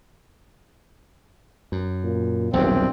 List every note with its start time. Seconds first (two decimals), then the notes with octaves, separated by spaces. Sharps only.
1.72 F#2
2.03 A#2
2.53 D#1 B1 E2 G2 C4